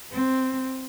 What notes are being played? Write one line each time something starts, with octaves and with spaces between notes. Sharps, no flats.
C4